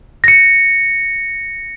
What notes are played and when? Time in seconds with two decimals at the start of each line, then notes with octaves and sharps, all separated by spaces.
0.24 A#6 C#7